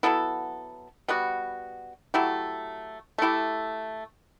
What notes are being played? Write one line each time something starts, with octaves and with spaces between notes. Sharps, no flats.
F#3 B3 E4 A4
G3 B3 F#4
F#3 A3 E4 G4
A3 E4 G4